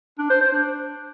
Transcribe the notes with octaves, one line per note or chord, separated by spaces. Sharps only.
D4
C5
C5
D4